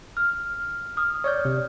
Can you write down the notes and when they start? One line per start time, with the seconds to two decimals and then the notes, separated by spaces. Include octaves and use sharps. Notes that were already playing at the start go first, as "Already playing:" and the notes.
0.17 F6
0.97 D#6 F6
1.24 C#5 D5 G6
1.45 C3